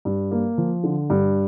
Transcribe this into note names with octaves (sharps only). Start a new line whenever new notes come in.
G2
A#3
F3
D3
G2